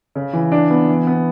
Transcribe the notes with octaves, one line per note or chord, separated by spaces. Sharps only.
C#3
E3
D4
B3
E3
B3